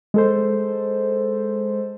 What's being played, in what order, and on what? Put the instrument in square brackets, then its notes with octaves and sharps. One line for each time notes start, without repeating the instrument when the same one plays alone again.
[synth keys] G#3 A4 C5